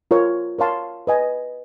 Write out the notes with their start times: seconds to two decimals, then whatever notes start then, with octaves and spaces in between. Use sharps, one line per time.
0.11 F4 A#4 C#5
0.59 A#4 C#5 F5 A5 C6
1.07 B4 D#5 G#5